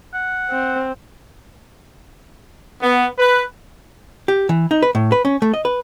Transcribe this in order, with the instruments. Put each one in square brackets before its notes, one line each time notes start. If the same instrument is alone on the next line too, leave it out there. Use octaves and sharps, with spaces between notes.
[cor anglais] F#5
[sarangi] C4
[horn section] B3
B4
[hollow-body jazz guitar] G4
E3
D#4
B4
A2
B4
C#4
A3
D#5
B4